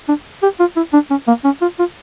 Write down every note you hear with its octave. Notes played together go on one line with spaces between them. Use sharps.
D4
G4
F4
E4
D4
C#4
A#3
C#4
F4
F4